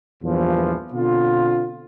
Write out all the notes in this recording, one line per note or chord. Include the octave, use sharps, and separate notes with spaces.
E2 G2 A#2 E3 F3
B2 D3 C4 F4